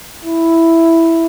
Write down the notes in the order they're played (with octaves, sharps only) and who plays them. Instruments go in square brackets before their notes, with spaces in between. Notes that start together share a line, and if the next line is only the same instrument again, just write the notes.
[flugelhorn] E4